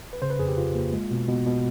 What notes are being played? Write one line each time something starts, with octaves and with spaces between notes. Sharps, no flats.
B4
C#3 C5
B4
F2 G#4
G4
F2 F4
A#3
G#3
B2
B2
B2